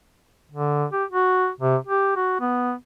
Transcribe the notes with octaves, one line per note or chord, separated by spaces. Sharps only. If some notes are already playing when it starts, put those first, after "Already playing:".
D3
G4
F#4
C3
G4
F#4
B3